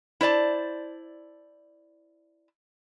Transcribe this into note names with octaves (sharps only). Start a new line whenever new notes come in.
E4 C5 D5 A5